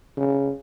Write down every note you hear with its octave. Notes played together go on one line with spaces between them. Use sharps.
C#3